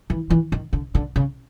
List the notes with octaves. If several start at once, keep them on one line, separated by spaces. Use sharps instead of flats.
E3
E3
D#3
D3
D3
C#3